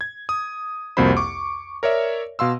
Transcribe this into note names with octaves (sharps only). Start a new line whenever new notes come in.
G#6
D#6
C2 F2 A#3 F#4 C5 B5
C#6 D6
A#4 C#5 D5 E5
B2 F5 C6 E6